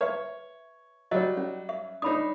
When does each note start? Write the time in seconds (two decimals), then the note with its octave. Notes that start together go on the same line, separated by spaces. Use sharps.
0.01 B4 C#5 E5
1.11 F#3 G3 C#5 D#5
1.37 C#4
1.69 E5
2.02 D4 D#4 C#5 B5 D#6